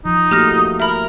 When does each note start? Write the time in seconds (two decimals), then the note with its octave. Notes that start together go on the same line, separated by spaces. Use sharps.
0.05 F3 D#4
0.31 A3 A#3 F#4 G4 F6 A#6
0.52 E4
0.80 A#4 E5 B5